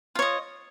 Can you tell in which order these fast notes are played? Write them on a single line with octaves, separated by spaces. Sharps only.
F4 C#5 D#5